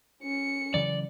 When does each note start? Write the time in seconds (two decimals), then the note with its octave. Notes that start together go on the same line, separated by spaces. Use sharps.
0.23 C#4 C#7
0.74 C#3 E3 F#3 D5